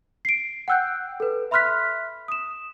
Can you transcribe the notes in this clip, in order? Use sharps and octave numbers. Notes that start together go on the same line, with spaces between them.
C7 D7
F#5 G5 E6 F#6 G6
A4 B4
E5 B5 C6 F6 F#6 B6
D#6 E7